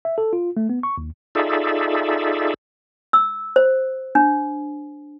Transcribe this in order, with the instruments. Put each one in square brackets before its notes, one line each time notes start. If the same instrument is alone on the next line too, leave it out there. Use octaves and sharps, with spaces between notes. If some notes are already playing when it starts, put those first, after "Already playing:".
[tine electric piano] E5
A4
F4
A3
B3
C#6
D#2
[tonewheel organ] D#4 F4 G#4 A4 D5 E5
[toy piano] E6
C5
D4